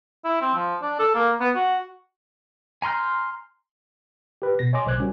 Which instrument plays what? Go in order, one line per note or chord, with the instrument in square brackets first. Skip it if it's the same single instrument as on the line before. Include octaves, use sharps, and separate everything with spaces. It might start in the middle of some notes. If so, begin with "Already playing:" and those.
[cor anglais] E4
C4
F3
D4
A4
A#3
B3
F#4
[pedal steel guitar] G#5 A#5 C6 F6 G6
[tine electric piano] G4 B4
B2 A#6
C#5 D#5 G#5 C6 D6
B1 C#3 C5 D6 F#6 G#6
G3 C#4 F#4